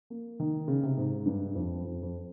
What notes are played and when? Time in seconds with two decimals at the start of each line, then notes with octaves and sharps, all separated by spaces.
0.10 A#3
0.40 D#3
0.68 C#3
0.83 C3
0.97 G#2
1.26 G2
1.55 F2
1.85 F2
2.03 F2